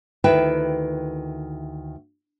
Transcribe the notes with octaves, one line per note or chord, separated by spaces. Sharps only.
D2 D#3 E4 B4 E5 G5